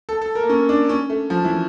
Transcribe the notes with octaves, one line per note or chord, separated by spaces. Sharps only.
A4
A4
A#4
A#3
C#4
D4
C#4
A3
F3
E3